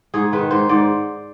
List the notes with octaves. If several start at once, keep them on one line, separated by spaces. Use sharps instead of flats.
G#2 G#4
D#3 B4
G#2 C5
G#2 D5